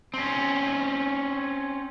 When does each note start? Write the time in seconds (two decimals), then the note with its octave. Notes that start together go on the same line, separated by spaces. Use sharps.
0.14 C4 C#4